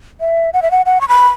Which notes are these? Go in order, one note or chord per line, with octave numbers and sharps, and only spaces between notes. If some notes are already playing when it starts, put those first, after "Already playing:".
E5
F#5
E5
F#5
F#5
C#6
B5